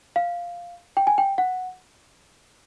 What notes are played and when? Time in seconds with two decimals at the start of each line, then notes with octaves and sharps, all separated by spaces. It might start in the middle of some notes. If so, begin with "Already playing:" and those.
0.16 F5
0.97 G5
1.07 G#5
1.18 G5
1.38 F#5